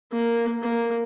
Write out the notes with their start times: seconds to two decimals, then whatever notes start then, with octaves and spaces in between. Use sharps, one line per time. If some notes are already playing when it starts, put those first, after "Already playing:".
0.12 A#3
0.62 A#3